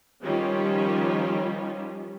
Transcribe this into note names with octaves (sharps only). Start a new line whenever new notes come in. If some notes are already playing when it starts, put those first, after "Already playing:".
D#3 F3 G3 C#4 F4 G4